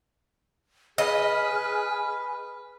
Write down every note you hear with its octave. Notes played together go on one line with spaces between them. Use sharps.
G#4 B4 D#5 G#5 F6